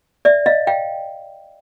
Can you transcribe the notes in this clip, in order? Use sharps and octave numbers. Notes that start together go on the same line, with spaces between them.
D5 E5
D#5 F5
F5 G5